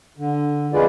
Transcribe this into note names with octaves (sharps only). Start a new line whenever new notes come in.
D3
F2 G#3 F4 G#4 B4 D5